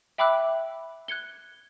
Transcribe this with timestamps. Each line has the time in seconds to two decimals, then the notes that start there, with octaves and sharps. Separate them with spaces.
0.18 E5 G5 B5 D6 E6 F#6
1.08 F#6 G#6 C#7 G7